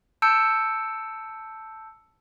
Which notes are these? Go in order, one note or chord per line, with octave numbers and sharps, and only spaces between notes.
A5 E6 G6 C#7 D7